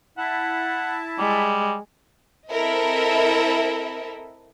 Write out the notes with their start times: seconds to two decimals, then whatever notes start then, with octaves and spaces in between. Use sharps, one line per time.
0.18 E4 E5 F#5 A5
1.18 G3 G#3
2.49 C4 E4 A4 A#4 D#5 E5